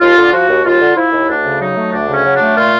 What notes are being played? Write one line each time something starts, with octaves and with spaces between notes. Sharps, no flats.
D#2 F4
D3
F3 F#4
D#2
D#2 F4
D3
F3 E4
D#2
D2 D4
C#3
F#3 D#4
A3
D2 D4
C#3
C#4
F#3
D4
A3
A#2 F4